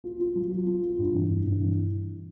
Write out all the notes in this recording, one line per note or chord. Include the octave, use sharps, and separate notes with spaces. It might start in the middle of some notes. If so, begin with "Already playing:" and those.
F4
F4
F#3
F4
F4
F4
G2
E3
G2
G2
E3